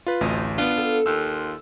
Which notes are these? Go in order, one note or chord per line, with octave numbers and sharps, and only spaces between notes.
F4 B4
A1 D2 C4 D#4 F4
D#3 B3 D4 F4 B4 F#5
A4
D#2 F4 E6